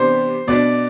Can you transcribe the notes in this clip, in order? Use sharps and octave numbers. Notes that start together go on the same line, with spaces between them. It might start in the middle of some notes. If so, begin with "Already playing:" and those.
Already playing: C3 E3 B3 D4 C5
B2 B3 D4 D5